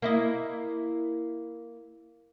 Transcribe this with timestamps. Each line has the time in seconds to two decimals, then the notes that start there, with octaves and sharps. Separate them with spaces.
0.02 A#3 E4 D#5